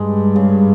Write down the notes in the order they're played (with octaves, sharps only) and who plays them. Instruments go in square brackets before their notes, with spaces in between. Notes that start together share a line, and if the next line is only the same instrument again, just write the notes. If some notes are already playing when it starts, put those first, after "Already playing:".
Already playing: [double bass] G2 [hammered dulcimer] G#3
[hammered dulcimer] C#3